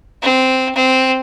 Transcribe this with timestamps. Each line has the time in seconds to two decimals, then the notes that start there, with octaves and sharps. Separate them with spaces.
0.22 C4
0.75 C4